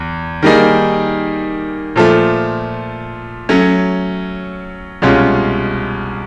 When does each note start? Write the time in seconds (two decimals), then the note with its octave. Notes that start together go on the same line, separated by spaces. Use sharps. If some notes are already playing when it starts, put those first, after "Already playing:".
Already playing: E2
0.42 D#3 G3 A#3 D#4 G#4
1.96 A#2 F3 A3
3.49 F#3 A3 C#4
5.02 C2 B2 G#3 C#4 F4